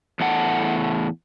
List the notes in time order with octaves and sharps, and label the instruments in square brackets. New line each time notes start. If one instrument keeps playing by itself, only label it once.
[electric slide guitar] E2 A2 A4 F#5